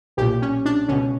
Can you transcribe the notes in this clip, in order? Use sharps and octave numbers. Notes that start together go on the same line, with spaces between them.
B1 A#2 G4
C#4
D4
C#2 B2 C#4